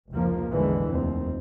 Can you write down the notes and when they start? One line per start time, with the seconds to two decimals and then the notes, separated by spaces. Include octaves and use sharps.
0.12 F1 C#2 F3 A#3
0.50 A1 E2 D3 E3 G#3
0.88 F1 D#2 C4